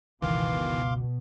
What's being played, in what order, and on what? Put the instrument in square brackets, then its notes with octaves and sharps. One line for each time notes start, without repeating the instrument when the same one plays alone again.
[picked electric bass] F#1 C#2 [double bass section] B2 [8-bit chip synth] D#3 E3 [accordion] F5 C6 D6